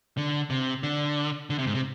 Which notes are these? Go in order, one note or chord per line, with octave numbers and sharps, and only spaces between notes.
D3
C3
D3
D3
C3
G#2
C3